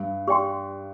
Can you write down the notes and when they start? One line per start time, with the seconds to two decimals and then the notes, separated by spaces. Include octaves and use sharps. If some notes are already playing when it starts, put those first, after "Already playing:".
Already playing: G2
0.28 G4 D5 G5 C6